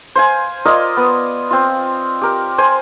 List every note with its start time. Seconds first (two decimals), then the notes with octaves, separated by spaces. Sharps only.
0.15 C5 F5 G#5
0.65 F4 A#4 D5 D#5
0.97 B3
1.50 C4 F4
2.21 G4 A#4
2.58 C5 G#5